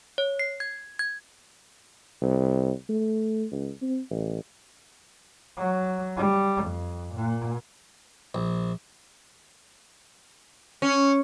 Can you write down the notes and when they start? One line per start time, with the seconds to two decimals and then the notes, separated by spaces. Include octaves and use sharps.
0.18 C#5
0.39 C7
0.60 G#6
0.99 G#6
2.21 C2
2.89 A3
3.51 C#2
3.81 C4
4.10 A1
5.58 F#3
6.17 G3
6.64 F2
7.15 A#2
8.35 A#1
10.82 C#4